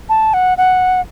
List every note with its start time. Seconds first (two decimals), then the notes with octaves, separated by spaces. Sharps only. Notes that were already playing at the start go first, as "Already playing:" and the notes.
0.09 A5
0.34 F#5
0.58 F#5